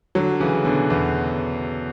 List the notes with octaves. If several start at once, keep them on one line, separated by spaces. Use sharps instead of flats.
D3 F#3
C#3 E3
B2 D3
E2